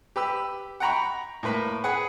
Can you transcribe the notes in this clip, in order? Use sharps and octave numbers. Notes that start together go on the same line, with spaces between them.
G4 B4 E6
F#5 G5 A#5 B5 C#6
A2 A#3 B4 B5
G#4 B4 F#5